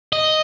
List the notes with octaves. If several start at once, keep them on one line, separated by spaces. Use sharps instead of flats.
D#5